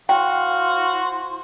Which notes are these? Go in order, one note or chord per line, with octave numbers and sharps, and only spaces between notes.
E4 F#4 C5 F5 G5 C6